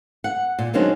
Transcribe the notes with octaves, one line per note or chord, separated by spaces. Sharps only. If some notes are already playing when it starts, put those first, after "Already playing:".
F#5
A#2
D#3 F#3 G#3 C#4 D4 C5